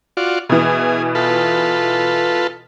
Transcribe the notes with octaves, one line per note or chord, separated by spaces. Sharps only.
F4 F#4 D5
B2 E3 G#4
F4 A4 B4